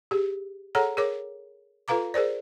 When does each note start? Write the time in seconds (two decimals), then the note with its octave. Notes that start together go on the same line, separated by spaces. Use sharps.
0.11 G4 G#4
0.75 G#4 A4 C#5 F#5 A#5
0.97 G#4 A#4 C#5 D6
1.88 F4 A4 B4 F5 A#5 D6
2.14 G#4 A#4 C5 D5